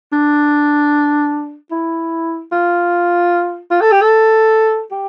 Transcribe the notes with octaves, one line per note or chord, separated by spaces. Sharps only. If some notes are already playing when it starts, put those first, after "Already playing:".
D4
E4
F4
F4
A4
G4
A4
G4